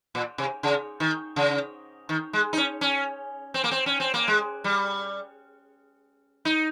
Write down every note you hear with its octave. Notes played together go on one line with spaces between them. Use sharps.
A#2
C3
C#3
D#3
C#3
D#3
G#3
D#4
C#4
C#4
C4
A#3
C4
C#4
C4
A#3
G#3
G3
D#4